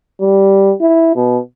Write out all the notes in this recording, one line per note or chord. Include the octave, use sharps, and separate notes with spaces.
G3
E4
B2